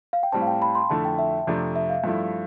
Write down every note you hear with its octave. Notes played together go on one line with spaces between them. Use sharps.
F5
G5
A2 G3 C4 A5
F5
G5
B5
C6
F2 D3 A3 E4 A5
G5
E5
F2 C3 F3 A3 D4
E5
F5
G2 F3 A3 E4